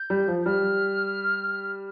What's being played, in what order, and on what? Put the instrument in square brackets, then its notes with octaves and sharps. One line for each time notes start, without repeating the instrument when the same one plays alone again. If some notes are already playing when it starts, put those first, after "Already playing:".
Already playing: [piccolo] G6
[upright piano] G3
F3
[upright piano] G3 [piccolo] F6